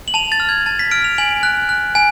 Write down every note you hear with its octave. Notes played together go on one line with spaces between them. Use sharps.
F#7
A5 F7
A6
F6
G#6
A5 A6
B6
F6 D7
F7
G#5 F#7
F#6
F#6
G#5